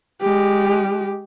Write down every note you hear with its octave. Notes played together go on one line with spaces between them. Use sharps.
G#3 G4